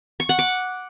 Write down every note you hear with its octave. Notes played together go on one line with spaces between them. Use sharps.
C#6
F#5
D6